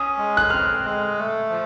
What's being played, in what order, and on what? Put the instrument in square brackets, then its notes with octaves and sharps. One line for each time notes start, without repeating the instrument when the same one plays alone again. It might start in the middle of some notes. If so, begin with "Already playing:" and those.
Already playing: [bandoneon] C#4 [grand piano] D#6
[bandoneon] G#3
[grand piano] F#6
[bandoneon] C4 [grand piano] F6
[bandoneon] G#3
A3
F3